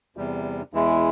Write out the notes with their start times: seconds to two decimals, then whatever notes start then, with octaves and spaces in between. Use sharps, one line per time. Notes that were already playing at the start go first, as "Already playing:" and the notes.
0.17 E2 C3 G3
0.73 E2 E3 G#3 E4